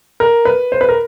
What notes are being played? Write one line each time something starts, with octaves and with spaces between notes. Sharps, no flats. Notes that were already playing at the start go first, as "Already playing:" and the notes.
A#4
B4
C5
B4
A#4